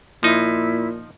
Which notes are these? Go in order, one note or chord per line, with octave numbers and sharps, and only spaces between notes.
A#2 F3 D#4 E4